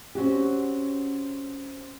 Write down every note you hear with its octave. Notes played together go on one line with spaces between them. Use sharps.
C4 C#4 F#4 G4